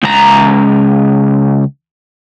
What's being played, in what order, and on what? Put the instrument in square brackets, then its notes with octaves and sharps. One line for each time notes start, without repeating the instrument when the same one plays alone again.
[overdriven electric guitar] C#2 A#5